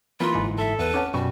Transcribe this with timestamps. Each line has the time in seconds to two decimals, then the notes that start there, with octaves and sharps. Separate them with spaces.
0.20 E3 A#3 F4 B4
0.33 G1 G#2 E4
0.58 A4 E5
0.79 E2 B4
0.94 C#4 F#5 A5 D6
1.14 F#2 B2 G3 F#4 C#6